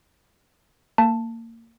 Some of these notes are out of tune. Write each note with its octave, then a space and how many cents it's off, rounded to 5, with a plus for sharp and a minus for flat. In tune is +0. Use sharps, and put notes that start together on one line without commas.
A#3 -25 A5 +5